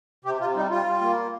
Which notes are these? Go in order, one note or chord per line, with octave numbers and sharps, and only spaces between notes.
C3 G4
C3 F4
G3 D#4
G3 F4
G3
A#3